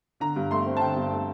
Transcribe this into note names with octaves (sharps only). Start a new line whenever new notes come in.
D3 A#5
G2
A3 C6
C4
A5
D3 G5
G2
A3